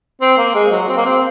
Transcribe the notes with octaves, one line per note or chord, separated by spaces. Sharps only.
C4
A#3
G#3
F#3
C4
A#3
C4